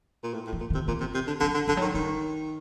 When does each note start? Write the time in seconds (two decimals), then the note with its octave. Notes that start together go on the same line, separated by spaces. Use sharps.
0.23 A#2
0.34 A2
0.47 A2
0.53 E3
0.61 A#2
0.70 D#3
0.74 C3
0.88 A#2 E3
1.00 C3
1.14 C3
1.27 D3
1.40 D3 F3
1.54 D3
1.67 D3 F3
1.77 F#3
1.82 D#3
1.94 D#3 G3